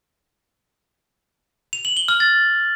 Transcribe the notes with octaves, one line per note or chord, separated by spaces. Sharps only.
F7
F#7
G7
F6
A6